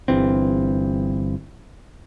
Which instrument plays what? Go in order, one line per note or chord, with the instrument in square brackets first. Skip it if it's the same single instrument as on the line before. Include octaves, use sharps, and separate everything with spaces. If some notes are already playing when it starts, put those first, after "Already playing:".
[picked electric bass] G1 G2 E3 C4